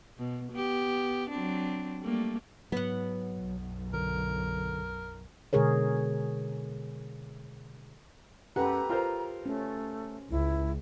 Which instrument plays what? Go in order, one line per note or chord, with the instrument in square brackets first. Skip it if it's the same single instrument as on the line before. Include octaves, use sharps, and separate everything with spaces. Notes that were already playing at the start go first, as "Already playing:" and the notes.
[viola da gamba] B2
B3 G4
F#3 C4 D4
G3 A3 A#3
[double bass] G#2 [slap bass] F#3 [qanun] B3 F#5
[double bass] B1 F#2
[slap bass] D3 [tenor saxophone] A#4
[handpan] B2 D3 G#3 G#4 A#4 C#5
[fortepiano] F#2 F#5 [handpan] G4 A4 B4 [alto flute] A#5
[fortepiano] F4 A#4 C5
[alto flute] A3 [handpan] C#4
[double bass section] C#2 [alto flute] E4